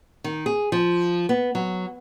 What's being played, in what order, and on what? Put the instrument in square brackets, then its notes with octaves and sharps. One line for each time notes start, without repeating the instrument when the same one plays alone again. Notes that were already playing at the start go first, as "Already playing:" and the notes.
[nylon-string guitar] D#3
G#4
F3
B3
F#3